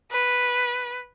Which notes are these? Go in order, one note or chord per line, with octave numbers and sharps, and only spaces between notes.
B4